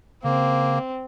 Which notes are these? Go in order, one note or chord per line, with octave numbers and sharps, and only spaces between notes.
C#3 A#3 C4